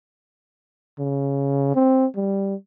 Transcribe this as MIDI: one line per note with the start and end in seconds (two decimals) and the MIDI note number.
0.99 1.72 49
1.75 2.06 60
2.16 2.55 55